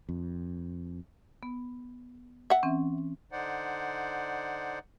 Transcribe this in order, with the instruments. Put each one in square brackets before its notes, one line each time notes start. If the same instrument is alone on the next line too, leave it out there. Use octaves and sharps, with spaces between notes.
[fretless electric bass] F2
[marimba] B3
[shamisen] E5 F#5
[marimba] E3 C4 C#4
[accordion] D3 D#4 C5 D5 F#5